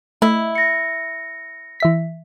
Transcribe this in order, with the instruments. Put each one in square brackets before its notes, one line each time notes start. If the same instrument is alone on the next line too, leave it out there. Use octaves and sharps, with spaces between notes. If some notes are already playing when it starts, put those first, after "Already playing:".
[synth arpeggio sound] A3 [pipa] E4 [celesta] D#5
[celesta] A#6 C#7
[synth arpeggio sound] E3 E5 B6